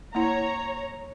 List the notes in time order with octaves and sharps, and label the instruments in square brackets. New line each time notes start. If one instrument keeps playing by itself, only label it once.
[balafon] A#3 E4 [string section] C#5 A#5